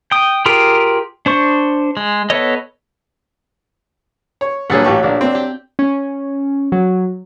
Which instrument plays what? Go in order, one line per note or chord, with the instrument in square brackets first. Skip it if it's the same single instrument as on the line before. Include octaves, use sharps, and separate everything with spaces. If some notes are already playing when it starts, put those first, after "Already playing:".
[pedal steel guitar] G5 D#6
F4 G4 G#4 A#4 G5
D4 C5 C#6
G#3
B3 A4 C#5 D#5
[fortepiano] C#5
[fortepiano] G2 A#2 G#4 [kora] F#3 A4 F#5
[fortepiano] A1 G4 C#6 [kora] E5
[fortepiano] A#1 D4
C4 D4
[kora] G4
[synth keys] C#4
F#3